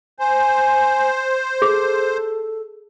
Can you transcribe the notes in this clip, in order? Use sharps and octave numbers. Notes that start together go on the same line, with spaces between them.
C5 G#5
G#4 A4